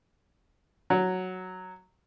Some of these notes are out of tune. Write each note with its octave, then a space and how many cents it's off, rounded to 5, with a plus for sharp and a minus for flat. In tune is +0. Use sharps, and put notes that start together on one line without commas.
F#3 +0